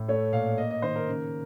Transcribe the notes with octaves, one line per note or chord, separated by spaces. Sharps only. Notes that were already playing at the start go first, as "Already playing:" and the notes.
Already playing: A2
A3 C#5
A#2 F5
A#3 D#5
D#5
D#3 C5
A#4
C#3